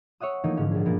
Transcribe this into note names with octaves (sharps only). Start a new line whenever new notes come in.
C#5 E5 F#5 D#6
E3 F3 A3 A#3 D#4 E4
G#2 D3 C#4
A#1 G#4
G2 B2 F3 A#3 B3